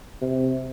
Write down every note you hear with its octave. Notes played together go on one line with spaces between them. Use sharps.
C3